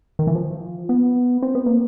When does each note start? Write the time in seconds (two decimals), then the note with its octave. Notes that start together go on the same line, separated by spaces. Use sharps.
0.19 D#3
0.27 E3
0.35 F3
0.89 B3
1.42 C4
1.55 B3
1.66 A#3